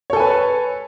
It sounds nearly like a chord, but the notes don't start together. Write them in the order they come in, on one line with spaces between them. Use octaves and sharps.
C#5 A4 G#5 B4 A5